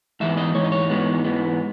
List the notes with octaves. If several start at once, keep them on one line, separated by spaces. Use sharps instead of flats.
G#2 E3 G#3 B3 E5
D#5
G#2 E3 C#5
D#5
C#5
G#2 E3 G#3 B3
G#2 E3 G#3 B3